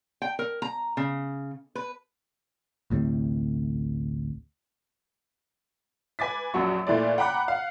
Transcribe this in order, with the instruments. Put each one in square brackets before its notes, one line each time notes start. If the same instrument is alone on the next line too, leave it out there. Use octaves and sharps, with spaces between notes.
[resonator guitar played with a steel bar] G5
A#4
A#5
C#3
B4
[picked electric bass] A1 D2 A2 C3
[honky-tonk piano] B4 G#5 D6 A6 B6
A#1 F#2 F3 F#3 F#4 C#6
A#2 E3 A3 D5
F#5 G5 A#5 B5 D6 F#6
F5 F#5